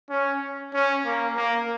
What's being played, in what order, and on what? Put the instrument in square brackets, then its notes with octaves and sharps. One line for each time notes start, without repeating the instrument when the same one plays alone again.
[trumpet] C#4
C#4
A#3
A#3